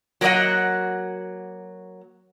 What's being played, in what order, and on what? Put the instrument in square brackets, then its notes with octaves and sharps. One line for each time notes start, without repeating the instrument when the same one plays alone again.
[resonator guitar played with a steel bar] F#3 A#3 F#4 D5 D#5 F#5